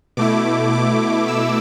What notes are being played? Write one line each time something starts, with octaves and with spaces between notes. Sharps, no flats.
B2 A3 E4 D6
D6
E6